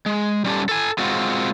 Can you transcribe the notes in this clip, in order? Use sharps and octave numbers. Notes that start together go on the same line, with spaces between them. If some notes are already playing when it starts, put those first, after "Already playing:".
G#3
G3 C#4 F4 G4 A4
A4 G#5
G#3 C4 F4 F#4